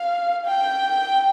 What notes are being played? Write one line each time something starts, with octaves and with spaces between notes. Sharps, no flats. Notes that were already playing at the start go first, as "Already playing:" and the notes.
Already playing: F5
G5